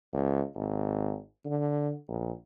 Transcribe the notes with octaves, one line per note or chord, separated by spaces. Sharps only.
C#2
G#1
D3
A#1